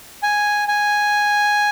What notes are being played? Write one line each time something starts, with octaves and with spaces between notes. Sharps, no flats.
G#5
G#5